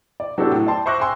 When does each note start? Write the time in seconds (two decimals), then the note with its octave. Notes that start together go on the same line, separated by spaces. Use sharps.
0.20 D5
0.38 F#3 B3 D4 E4 G4 A4
0.51 A2
0.67 D5 G5 A5 C6
0.86 C5 E5 C#6 D6 F#6 A#6
1.00 G5 G#5 C6 E6